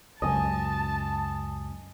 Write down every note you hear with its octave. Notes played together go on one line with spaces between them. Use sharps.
C#2 F#2 D#5 G#5 A5